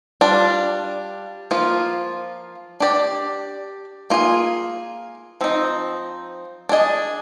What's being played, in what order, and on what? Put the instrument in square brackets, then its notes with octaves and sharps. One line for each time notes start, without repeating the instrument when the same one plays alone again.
[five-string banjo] G3 D4 F4
F3 A#3 F4
D4 G4 D5
A#3 F4 G#4
F3 C4 D#4
D4 G#4 D#5